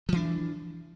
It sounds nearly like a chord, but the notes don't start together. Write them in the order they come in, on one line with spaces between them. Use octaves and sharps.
F3 E3 D4